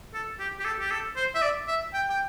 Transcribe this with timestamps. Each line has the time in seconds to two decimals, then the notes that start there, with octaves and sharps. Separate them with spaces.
0.14 A4
0.39 G4
0.60 G4
0.65 A4
0.80 G4
0.91 A4
1.16 C5
1.35 E5
1.42 D5
1.68 E5
1.94 G5
2.10 G5